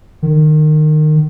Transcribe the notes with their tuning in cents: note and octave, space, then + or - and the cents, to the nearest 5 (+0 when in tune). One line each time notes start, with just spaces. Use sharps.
D#3 -25